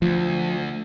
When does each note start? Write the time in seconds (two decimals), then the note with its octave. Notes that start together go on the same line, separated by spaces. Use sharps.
0.02 D2 F3